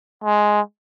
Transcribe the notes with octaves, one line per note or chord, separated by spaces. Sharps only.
G#3